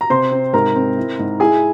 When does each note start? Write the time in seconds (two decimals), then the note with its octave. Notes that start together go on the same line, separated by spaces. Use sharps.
0.01 A#5
0.10 C3 C5 C6
0.32 C4
0.53 G#2 A#4 A#5
0.76 C4
0.97 E4
1.19 G#2
1.40 E4 G#4 G#5